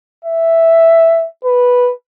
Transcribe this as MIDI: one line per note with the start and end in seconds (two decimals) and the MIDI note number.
0.25 1.27 76
1.45 1.92 71